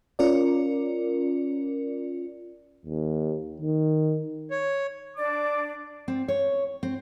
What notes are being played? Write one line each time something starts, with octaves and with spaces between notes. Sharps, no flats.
C#4 F4 A#4 D5
D#2
D#3
C#5
D4 D5 D6
C4
C#5
C4